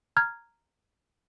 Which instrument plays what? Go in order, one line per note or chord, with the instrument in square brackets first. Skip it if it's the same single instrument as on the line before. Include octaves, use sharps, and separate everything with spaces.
[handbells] A#5 F6 G#6